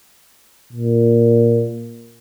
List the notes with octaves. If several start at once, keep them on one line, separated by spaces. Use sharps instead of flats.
A#2